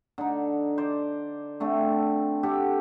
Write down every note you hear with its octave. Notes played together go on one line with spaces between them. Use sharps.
D3 D#4
C5 D5
D3 A3 C4 A4
G4 A4 F#5